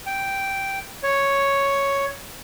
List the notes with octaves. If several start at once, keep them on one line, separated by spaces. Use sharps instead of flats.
G5
C#5